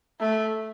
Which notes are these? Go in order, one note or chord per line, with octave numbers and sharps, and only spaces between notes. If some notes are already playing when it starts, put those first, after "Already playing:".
A3